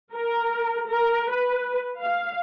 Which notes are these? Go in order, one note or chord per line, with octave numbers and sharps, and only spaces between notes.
A#4
A#4
B4
F5